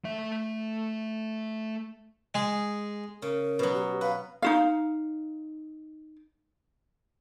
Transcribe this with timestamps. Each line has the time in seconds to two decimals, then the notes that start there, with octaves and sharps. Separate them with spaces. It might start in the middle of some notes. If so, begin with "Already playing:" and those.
0.05 A3 E5
2.35 G#3 G#4
3.22 C#3 A#4
3.59 B2 F#3
3.75 G4
4.01 B4 F5
4.42 D#4 F#4 F5